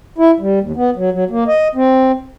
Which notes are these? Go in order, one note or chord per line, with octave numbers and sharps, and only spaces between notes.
E4
G3
D#2
B3
F#3
F#3
A#3
D#5
C4